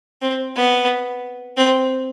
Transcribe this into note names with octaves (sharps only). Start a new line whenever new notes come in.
C4
B3
C4